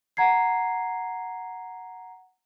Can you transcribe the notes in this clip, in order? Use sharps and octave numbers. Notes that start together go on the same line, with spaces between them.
F#5 A#5 G#6 C7